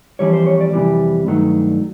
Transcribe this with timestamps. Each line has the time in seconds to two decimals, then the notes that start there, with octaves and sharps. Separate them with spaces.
0.19 F2 C3 E3 G3 C#5
0.33 C5
0.46 C#5
0.61 D5
0.73 F2 C3 E3 G3
1.27 G2 D#3 F#3 A3